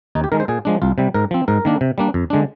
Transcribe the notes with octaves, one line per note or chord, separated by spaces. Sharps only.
D#2 D#4
G4
D#3 G#3 A#4
C5
A#2 G#4
F3 G#3 D4
C2 F4
C3 G3
G#2 A#4
F3 C4
G#2 A#4
D#3 A#3 D4
C3
G3 A#3 D4
F2
D3 G#3 D4